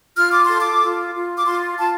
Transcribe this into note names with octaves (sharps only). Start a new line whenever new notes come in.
F4 F6
D6
C6
A4
D6
F4
F4
D6
F4 C6
F4 A5